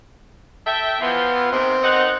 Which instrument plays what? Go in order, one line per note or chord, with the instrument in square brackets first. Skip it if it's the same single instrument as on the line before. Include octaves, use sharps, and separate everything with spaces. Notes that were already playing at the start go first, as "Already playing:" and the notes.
[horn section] A4 E5 G5
[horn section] E3 F3 F4 [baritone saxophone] B3
[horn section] C3 D#3 [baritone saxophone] C4
[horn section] D#3 D#4 F#5